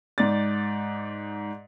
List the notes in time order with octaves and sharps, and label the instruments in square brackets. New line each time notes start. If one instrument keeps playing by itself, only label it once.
[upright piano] G#2 D5 A6